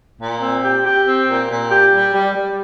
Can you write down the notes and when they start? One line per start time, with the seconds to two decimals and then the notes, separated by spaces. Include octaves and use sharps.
0.21 A#2
0.42 C4
0.64 G4
0.85 G4
1.07 C4
1.28 A#2
1.49 A#2
1.71 G4
1.92 G3
2.14 G3
2.35 G3